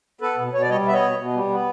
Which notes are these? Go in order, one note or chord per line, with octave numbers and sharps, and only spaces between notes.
B3 A4 B4
B2
B2 C#5
D5
G3 C#5 D#5
B3 E5
C#5 D#5
B2
B2
G3
B3